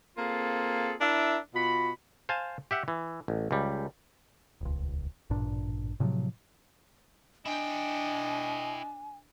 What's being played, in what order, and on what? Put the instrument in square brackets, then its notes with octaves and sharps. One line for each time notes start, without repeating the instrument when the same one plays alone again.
[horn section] A#3 C4 F4 G#4 A4
D4 E4 A#4 E5
B2 F4 F#4 B5
[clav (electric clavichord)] C5 F5 G#5 A5
G4 E5 F#5
E3
A1
C#2 G3
[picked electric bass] D#1 C#2
A1 G2 A#2 D4
A2 C3 F3 F#3
[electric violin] D4 [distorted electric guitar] E4 G5 [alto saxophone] D#5 [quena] G#5